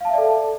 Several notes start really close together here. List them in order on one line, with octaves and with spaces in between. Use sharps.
F5 A5 E5 D5 A4